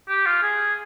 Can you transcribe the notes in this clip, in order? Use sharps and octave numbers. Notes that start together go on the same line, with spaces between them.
G4
F4
G#4